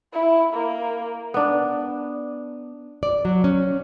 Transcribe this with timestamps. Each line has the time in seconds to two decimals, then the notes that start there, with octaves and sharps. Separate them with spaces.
0.13 E4
0.53 A#3
1.34 B3 D4
3.03 D5
3.25 F#3
3.44 C#4